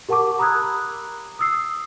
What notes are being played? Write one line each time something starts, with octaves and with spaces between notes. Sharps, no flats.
G4 A#4 F#5 A5 C#6 D6
A#5 B5 D#6 E6 F#6 G#6
D#6 E6 C7